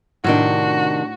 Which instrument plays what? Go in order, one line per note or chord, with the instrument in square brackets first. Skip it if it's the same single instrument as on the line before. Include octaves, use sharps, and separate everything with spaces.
[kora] A2 G5 [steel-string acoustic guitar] C3 D#3 D4 [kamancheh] F#4